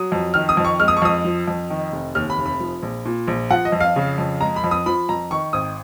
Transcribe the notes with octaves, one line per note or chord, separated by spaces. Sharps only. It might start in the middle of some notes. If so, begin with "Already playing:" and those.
Already playing: F#3 D#6
F2
D#3 F6
D#6
F2
C#6
G#3 F6
D#6
C#6
F2 D#6
F3
F2
D#3
F1
D#2 F6
B5
F1
B5
F3
A#1
A#2
A#1
F3 F#5
D#5
F2
F5
C#3
F2
G#3 A#5
B5
F2
D#6
F3 B5
F2 A#5
D#3 C#6
G#1 D#6